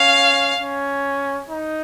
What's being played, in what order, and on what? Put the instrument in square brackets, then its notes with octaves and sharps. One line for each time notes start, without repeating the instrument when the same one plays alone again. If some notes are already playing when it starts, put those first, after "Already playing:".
Already playing: [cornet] C#4 [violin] F5
[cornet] C#4
D#4